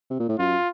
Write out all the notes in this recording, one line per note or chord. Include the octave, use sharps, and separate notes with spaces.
C3
A#2
A2
F#2 F4